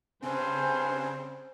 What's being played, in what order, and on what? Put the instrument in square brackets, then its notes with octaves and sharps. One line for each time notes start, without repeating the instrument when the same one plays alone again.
[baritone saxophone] G2 [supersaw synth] C#3 C4 [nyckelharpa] C5 [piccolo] G#5